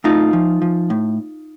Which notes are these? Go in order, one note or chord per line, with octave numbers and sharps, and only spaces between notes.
A2 D#4 F4
F3
F3
A2